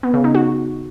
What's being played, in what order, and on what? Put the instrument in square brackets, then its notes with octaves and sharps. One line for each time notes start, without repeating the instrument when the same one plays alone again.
[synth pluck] B3
C#3
D#4
F#4